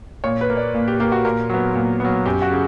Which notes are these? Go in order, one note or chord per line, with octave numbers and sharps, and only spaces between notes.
A#2 C#5
B4
A#3
D5
A#2
G4
A#3 G4
F#4
A#2 A#4
F#3 B3
A#2
F#3 B3
F#2 G4
F#4
C#3